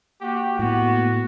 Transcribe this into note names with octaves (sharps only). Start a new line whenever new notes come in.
A#3 F#4 G4
A2 B3 F#4